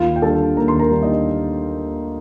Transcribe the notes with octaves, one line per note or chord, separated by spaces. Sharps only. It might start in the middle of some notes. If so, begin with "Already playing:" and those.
Already playing: D#2 F4 F5
G5
D3 G3 A4 A5
D#2 A#4 A#5
C6
A#4 A#5
D3 G3
D#4 D#5